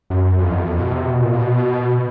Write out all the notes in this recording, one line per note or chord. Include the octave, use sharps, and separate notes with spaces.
F#2
F2
E2
F2
B2
C3
B2
A#2
B2